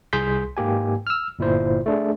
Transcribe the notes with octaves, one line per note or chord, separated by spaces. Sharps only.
C2 G#4 C6 G6 B6
G#2 A#3 G4 G#5
E6 F6
G1 A#2 E4 C5
A3 D4 G#4